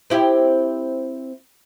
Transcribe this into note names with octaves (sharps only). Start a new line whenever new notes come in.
C4 E4 G4